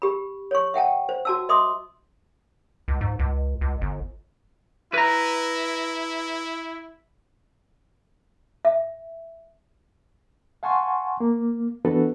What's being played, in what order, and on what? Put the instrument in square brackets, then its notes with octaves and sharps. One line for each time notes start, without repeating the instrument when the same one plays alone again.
[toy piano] G4 B5
C#5 C#6
E5 F#5 G5 A5
C5
F#4 A5 E6
D#5 E5 C6 D6 D#6
[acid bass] C#2
G#2
C#2
C#2
G1
[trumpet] E4 [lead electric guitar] B4 A#5
[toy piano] E5
[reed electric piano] F5 F#5 G#5 A5 C6 C#6
A#3
E3 B3 D4 F#4 A4 B4